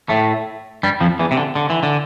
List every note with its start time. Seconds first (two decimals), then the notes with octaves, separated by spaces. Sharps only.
0.09 A2 A3
0.83 G2 G3
1.01 F2 F3
1.19 E2 E3
1.31 C3
1.37 D3
1.55 D3
1.70 E3
1.83 D3